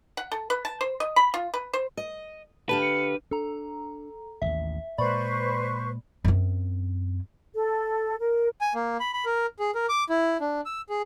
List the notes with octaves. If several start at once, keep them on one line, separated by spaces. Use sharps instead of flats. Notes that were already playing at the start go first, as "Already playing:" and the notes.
F#5
A4
B4
A5
C5
D#5
B5
F4
B4
C5
D#5
D3 G4 B4 F5 A5
C#7
D4 A4 A#5
A1 D#2 E5
A#2 G#3 B4 C5 D5 B5 C#6
F#2 C4
A4
A#4
G#5
A#3
B5
B5
A#4
G#4
A#4
D6
E4
D4
E6
G#4